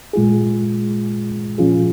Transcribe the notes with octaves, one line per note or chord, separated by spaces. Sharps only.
A#2 G#3 F4 G#4
A#2 F3 C#4 F4 G#4